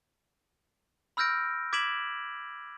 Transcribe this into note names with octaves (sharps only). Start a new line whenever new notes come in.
B5 E6 F6 G6 A#6 D7
D6 G#6 B6 D7 E7 F#7